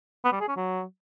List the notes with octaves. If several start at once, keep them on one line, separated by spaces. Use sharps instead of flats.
B3
G3
G#4
C#4
F#3